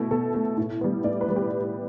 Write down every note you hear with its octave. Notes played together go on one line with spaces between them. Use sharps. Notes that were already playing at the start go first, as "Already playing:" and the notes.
Already playing: B2 A3 E4
B2 A4
A3
A2
G3 B3
A2 D5
B4
G3 B3
G4